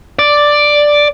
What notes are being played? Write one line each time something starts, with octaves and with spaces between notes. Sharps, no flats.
D5